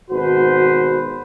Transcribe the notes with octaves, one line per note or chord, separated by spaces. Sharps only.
G#1 B2 F#4 B4 C5